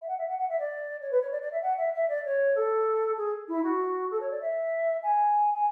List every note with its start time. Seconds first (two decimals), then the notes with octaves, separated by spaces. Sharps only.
0.01 E5
0.07 F#5
0.17 E5
0.28 F#5
0.38 F#5
0.49 E5
0.59 D5
1.01 C#5
1.11 B4
1.21 C#5
1.31 D5
1.42 D5
1.51 E5
1.62 F#5
1.77 E5
1.93 E5
2.08 D5
2.24 C#5
2.55 A4
3.17 G#4
3.48 E4
3.63 F#4
4.10 A4
4.20 C#5
4.30 D5
4.41 E5
5.03 G#5
5.54 G#5